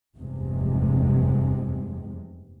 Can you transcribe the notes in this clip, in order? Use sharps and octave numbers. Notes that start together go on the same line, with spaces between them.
F1 E2 G2 C3 G#3